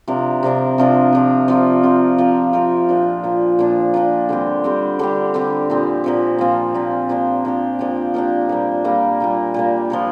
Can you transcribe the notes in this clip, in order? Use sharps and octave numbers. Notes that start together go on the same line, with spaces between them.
C3 F3 D4 A#4
C3 F3 D4 A#4
C3 F3 D4 A#4
C3 F3 D4 A#4
F3 C4 F4 A#4
F3 C4 F4 A#4
F3 C4 F4 A#4
F3 C4 F4 A#4
A#2 F3 D4
A#2 F3 D4
A#2 F3 D4
A#2 F3 D4
D3 G3 C4 G4
D3 G3 C4 G4
D3 G3 C4 G4
D3 G3 C4 G4
A#2 F3 C4
A#2 F3 C4
A#2 F3 C4
A#2 F3 C4
F3 A#3 D4 G4
F3 A#3 D4 G4
F3 A#3 D4 G4
F3 A#3 D4 G4
A#2 G3 A#3
A#2 G3 A#3
A#2 G3 A#3
A#2 G3 A#3
F3 D4 A#4